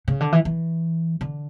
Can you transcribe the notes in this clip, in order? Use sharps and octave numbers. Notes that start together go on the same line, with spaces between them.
C#3
D3
E3
E3
D3